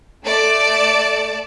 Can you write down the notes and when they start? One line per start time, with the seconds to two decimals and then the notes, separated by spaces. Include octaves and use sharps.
0.24 A3 D5 A5 D7